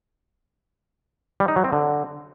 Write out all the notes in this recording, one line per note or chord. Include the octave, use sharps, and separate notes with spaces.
G3
D#4
F#3
C4
D3